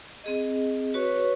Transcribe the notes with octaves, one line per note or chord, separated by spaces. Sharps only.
C4 G#4 D#5
F#4 B4 C#5 C#6